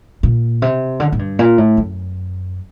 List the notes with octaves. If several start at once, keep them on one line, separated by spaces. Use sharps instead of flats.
A#2
C3
D3
A2
G2
A#2
A2
F#2